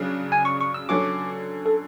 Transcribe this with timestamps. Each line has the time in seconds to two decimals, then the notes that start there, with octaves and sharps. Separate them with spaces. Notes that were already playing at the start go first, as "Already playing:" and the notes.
Already playing: C#3 F#3 D4
0.32 G#5
0.45 C#6
0.61 C#6
0.74 E6
0.89 D3 F#3 C#4 F#4 D6
1.66 A4